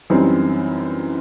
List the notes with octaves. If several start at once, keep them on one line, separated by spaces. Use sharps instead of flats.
F#2 E3 G3 C4 D#4